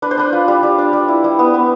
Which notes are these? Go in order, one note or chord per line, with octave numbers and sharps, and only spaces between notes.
D4 B4
C5
D4 B4
F4
G3
G3
D4
G3
E4
G3
B3
B3